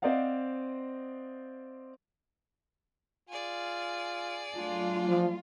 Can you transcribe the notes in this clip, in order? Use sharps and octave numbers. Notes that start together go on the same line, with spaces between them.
C4 C5 D5 D#5 F5 F#5
F4 G#4 D5
F#3 A3 D4 F4
F3